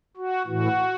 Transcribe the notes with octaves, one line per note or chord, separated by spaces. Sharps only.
F#4
A2 E3 F#4